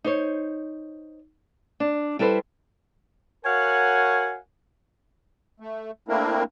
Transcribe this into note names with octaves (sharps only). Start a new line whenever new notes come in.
D#4 C5 C#5
D4
G3 E4 A4 B4 C5
F#4 A#4 C#5 F5 F#5 G#5
A3
A3 A#3 C4 D4 E4 A#4